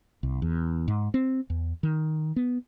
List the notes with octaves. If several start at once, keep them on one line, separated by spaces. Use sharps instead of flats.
C2
E2
G#2
C4
E2
D#3
B3